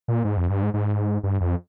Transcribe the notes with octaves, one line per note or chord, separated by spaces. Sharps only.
A#2
G#2
F2
G2
G#2
G#2
G2
F2